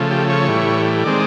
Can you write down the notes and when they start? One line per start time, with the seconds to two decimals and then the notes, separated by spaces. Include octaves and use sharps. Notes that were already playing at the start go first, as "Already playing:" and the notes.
Already playing: C#3 F3 A3
0.11 G4
0.30 C#5
0.48 A2 E3 G3
1.04 D#3 G#3 C4 D5